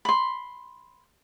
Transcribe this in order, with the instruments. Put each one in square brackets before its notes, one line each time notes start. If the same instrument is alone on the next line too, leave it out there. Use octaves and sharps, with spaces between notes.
[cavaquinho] B5 C6